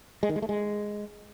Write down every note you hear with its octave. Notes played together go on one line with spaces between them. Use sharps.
G#3
D#3
G#3
A3
G#3